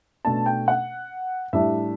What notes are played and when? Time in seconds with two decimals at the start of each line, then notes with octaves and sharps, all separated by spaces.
0.25 B2 A3 D4 A5
0.46 G5
0.68 F#5
1.53 A2 G3 D4 E5